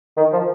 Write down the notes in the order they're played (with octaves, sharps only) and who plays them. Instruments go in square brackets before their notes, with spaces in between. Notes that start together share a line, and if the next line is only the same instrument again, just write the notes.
[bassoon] D#3
F3